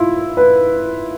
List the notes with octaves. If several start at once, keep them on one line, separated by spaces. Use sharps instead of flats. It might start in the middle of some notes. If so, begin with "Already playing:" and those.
Already playing: E4 F4
B4